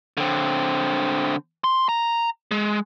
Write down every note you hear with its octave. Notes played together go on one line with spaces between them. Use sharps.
D3 C4
C6
A#5
G#3